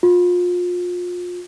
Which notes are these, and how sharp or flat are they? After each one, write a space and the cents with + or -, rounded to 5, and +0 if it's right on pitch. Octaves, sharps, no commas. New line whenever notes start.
F4 +30